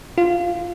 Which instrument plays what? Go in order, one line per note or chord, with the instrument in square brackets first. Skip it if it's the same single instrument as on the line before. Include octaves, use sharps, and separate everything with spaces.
[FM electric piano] F4